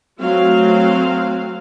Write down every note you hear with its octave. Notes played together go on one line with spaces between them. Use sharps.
F#3 A3 C4 F#4 F5